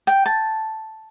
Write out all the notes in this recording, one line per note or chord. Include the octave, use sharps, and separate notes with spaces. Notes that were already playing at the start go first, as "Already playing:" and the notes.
G5
A5